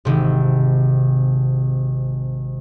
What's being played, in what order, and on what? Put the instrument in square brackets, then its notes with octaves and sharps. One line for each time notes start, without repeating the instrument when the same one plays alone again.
[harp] G#1 C3